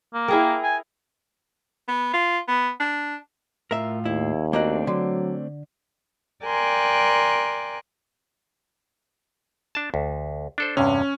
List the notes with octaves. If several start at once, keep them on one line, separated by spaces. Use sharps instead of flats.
A#3
E4 G#4 A#4 G5
G#5
B3
F4
B3
D4
A2 F4 A#4 E5
D#2 E4
A3 A#3 C4 D4 D#4 F#4
D3 F#3
A#4 D5 G5 G#5 C6 F#6
D4 A5
D2
D4 A4 C5
E2 G2 C3 C#4